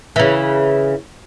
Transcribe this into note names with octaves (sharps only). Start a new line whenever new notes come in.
C#3 E3